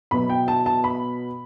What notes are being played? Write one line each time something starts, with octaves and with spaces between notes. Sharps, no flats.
B2 F#3 B3 B5
G5
A5
A5
B5